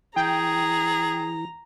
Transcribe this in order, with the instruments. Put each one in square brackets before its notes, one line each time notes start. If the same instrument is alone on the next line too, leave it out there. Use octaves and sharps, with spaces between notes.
[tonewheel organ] E3 [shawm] G#4 [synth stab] G5 [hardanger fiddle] A#5